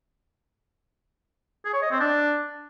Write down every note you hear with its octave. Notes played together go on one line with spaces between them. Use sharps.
G#4
C#5
D#5
C4
D4